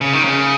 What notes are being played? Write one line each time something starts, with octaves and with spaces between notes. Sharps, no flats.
C#3
D#3
C#3